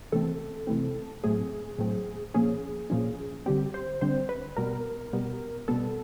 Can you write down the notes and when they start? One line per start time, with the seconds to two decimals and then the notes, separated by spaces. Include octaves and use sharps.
0.12 C3 E3 A3 C4 A4
0.67 C3 E3 A3 C4
1.24 A2 F#3 A3 C4 G#4
1.79 A2 F#3 A3 C4
2.34 A#2 F3 A#3 C#4 G#4
2.90 A#2 F3 A#3 C#4
3.46 D3 G3 C4 G4
3.74 C5
4.01 D3 G3 C4 C5
4.29 B4
4.57 B2 G3 B3 A#4
5.13 B2 G3 B3
5.68 B2 G3 B3 A4